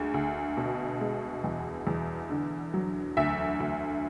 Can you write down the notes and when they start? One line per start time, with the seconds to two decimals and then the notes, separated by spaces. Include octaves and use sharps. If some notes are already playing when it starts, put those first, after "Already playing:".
Already playing: D2 G#3
0.14 D2
0.57 B2
1.01 G#3
1.44 E2
1.87 E2
2.30 D3
2.74 F#3
3.17 D2 E5
3.60 D2